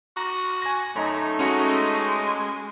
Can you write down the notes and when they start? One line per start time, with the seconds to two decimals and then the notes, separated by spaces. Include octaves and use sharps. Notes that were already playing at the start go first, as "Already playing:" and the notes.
0.17 F#4 A#5
0.62 G#5 A#6
0.96 F#2 A3 D#4 C#5
1.39 G#3 C#4 F#4 C#7